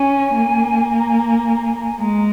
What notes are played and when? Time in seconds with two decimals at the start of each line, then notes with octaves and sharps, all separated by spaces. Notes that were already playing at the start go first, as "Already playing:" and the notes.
Already playing: C#4 G#5
0.35 A#3
0.90 G#5
0.99 A#5
1.09 G#5
1.18 A#5
1.28 G#5
1.38 A#5
1.46 G#5
1.56 A#5
1.65 G#5
1.75 A#5
1.84 G#5
1.99 G#3 A#5